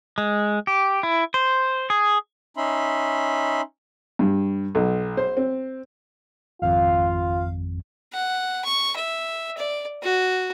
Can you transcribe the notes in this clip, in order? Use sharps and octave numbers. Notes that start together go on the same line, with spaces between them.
G#3
G4
E4
C5
G#4
C#4 D#4 E5 B5 C6
G2
B1
C5
C4
G#1 F2 F4 F5
F#5
C#6
E5
D5
F#4